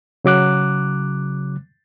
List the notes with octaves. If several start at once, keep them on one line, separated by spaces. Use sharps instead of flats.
C#3 F#3 D6 F#6